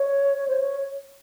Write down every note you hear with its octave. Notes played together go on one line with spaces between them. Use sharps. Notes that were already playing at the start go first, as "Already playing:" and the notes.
Already playing: C#5
C#5
C5
C#5